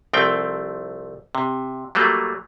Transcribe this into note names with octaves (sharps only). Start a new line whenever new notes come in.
C2 F3 A3 C4 G5
C3
F#3 G3 A3 A#3